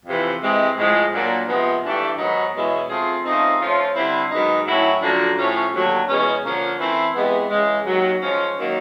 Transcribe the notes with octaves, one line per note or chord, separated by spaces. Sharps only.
F2 C3 E3
C3 E3 G#3 C4
A2 F3 G#3
A#2 F#3 A#3 D4
F2 C3 F3 G#3 B3
G2 E3 A3 D4 G4
G#2 D#3 F#3 B3 D#4
E2 B2 G#3 C#4 E4
F3 A3 C4 F4 G#4
C#3 F3 A3 C4 D#4
F3 A3 C#4 F4
D3 G3 C4 E4
F#2 D#3 G#3 B3 D#4
A2 F#3 A3 C#4 E4
F#2 D3 F3 A#3 D4
A2 F3 A3 C#4
D#2 D3 F#3 A3
E2 B2 G#3 C#4
D3 F3 A#3 C#4
E3 A3 C4 E4
C3 E3 G#3 B3
C#3 E3 G#3
D#2 D#3 F#3
F3 G#3 C#4
D#3 F#3 A#3